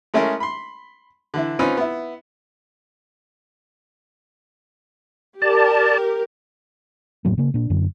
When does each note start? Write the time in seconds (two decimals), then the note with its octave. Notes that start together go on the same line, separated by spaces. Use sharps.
0.14 G#3 A3 C#4 E4 G#4 A#4
0.40 B5 C6
1.34 D3 E3 E4
1.59 C4 C#4 D#4 F4 B4
1.77 B3 E4
5.42 G4 A#4 D5 A5
7.25 F#1 A2 F#3 A#3
7.38 C#3 A#3
7.54 A#2 D4
7.70 F#2 D3